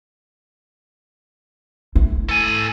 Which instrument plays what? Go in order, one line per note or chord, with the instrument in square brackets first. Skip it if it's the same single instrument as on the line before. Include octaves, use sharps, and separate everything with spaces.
[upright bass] A3 E4
[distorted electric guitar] A4 G#5